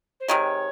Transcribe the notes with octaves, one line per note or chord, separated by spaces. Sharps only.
C5
C3 D#3 G#3 C#5